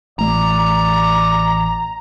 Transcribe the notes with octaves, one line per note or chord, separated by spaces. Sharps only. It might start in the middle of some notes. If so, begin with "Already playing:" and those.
A1 A3 D5 A#5